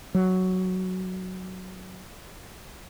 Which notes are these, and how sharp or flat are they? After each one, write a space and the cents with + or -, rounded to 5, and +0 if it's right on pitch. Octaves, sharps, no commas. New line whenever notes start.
F#3 +5